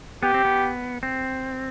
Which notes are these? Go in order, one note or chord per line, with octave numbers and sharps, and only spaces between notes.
B3 G4
C4
B3
C4